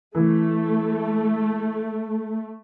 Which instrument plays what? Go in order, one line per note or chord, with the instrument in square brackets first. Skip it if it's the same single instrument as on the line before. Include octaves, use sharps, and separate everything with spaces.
[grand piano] E3 [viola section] A3